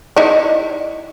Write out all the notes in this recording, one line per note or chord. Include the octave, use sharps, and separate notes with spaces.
D#4 E4 D5